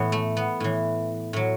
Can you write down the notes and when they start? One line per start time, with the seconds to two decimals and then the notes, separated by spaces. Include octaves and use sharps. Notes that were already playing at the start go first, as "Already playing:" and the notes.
Already playing: A2 E3 B3
0.12 A3
0.37 B3
0.60 A2 E3
1.33 A2 F#3